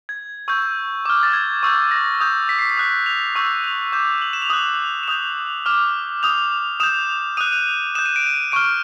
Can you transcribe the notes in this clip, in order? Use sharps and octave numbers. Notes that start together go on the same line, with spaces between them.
G#6
C#6 E6 G6
G6
D6 F6
A6
G#6
C#6 E6 G6
A#6
D#6 G6
B6
C7
B6
D#6 F#6
F7
C#6 E6 G6
F7
D6 G6
F#7
E7
F7
D#6 F#6 F#7
E7
D#6 G6 F7
D6 F6
D#6 G6 F7
D#6 G6 E7
D#6 F#6 D#7
D#7
D#6 G6 E7
D#7
D7
D#7
C#6 F6 D7